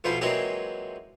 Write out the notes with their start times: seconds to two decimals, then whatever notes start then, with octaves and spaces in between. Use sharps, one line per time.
0.04 B1 E2 F3 F4 C5 B5
0.21 A#2 E3 F#3 G#3 C4 G4